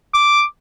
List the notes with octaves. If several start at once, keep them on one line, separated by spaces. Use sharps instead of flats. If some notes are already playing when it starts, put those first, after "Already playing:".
D6